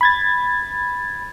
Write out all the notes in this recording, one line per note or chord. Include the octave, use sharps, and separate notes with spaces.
B5 G#6 A6